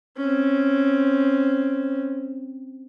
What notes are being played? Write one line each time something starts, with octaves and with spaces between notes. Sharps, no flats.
C4 C#4